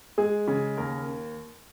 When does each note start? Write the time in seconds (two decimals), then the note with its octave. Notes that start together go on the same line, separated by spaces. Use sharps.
0.18 G#3 G#4
0.48 C#3
0.77 D#2 A#4